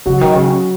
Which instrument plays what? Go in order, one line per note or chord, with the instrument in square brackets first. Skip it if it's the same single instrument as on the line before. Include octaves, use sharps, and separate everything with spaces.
[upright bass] C#3 [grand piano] F#3 F#4
[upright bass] D#3
C#3